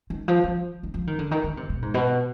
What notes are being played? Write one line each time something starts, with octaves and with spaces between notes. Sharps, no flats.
D#3
F3
F3
D#3
F3
D#3
D3
D#3
D3
C3
B2
G#2
B2